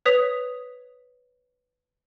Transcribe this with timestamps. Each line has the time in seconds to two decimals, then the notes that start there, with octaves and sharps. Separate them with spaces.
0.05 B4 C#5 D#6 B6 F7